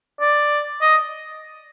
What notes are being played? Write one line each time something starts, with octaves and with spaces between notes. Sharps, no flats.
D5
D#5